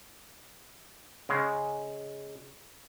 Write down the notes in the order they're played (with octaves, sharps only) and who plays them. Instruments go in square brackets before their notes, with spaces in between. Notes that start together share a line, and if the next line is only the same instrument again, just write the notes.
[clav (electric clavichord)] C#3 G#3